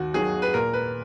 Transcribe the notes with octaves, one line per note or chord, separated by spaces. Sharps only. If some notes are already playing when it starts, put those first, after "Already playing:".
Already playing: D#2 F#4
D#3 F#3 G#4
B4
A#2 A#4
B4